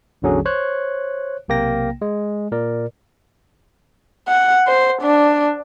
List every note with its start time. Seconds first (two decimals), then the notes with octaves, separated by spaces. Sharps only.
0.22 A1 E2 D3 F#3 C#4 G#4
0.45 C5 C#5 F#6
1.48 B1 C3 A#3 G5 A#6
2.02 G#3
2.52 A#2 A#4 D5
4.28 F#5
4.68 C5
5.02 D4